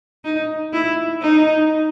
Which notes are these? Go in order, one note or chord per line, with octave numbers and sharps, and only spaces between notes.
D#4
E4
D#4